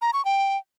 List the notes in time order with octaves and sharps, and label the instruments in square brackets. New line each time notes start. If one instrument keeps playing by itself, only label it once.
[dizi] A#5
C#6
G5